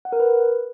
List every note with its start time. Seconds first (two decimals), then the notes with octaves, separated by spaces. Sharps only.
0.05 F#5
0.12 A#4
0.20 B4